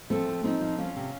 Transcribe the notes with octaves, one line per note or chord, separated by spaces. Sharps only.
F3 A3 C4
F3
F3 C4 D#4
F3
F2 C#4 F4
C3